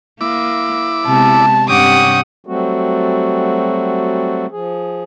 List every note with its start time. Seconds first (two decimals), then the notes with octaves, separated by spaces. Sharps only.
0.21 A#3 E4 D6
1.06 C3 G#3 B3 A5
1.69 G2 C3 C#4 G4 F#5 D6 D#6
2.47 F#3 G3 A3 C4 F#4
4.52 F3 G#4